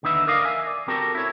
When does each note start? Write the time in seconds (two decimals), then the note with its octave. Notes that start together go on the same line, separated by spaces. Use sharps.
0.03 D#2 D3 D#4 B4 E5
0.27 A#4 D5 D#5 F5
0.45 E5 G#5
0.67 D5
0.88 C4 F#4 G4 A4 A#4
1.15 E4 C#5